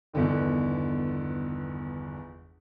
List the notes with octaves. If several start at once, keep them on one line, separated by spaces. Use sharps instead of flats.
G1 E2 D3 D#3